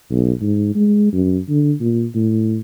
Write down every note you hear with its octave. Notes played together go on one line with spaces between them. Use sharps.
B1
G#2
G#3
F#2
D3
A#2
A2